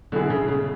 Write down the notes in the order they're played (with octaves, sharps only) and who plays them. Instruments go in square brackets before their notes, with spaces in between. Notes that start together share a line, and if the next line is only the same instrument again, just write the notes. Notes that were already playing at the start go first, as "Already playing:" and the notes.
[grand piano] B2 F#3 B3 E4 G#4 [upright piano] D3
[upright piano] C#3
C#3